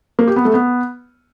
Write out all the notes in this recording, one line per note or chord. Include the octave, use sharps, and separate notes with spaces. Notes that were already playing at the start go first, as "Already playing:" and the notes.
A#3
G4
B3
A3
B3